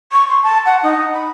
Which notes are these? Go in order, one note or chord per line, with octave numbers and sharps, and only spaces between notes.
C#6
C6
A5
F#5
D#4
B5